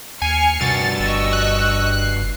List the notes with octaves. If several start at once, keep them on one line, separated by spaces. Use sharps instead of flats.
D#2 G#5 F6 C7 C#7
G2 C3 F#4 A6
G1 D#5 C#6 E6
F#6
F#1 C7